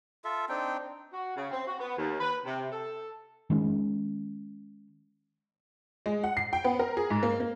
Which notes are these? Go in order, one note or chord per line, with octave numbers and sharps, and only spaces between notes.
F4 A4 E5
C4 D4 D#4 G5
F#4
C#3
C4
F#4
B3
D#2
B4
C3
A4
D#3 G#3 C#4
G#3
F#5
C7
G5
B3
A#4
G#4
G#2
A#3
A#3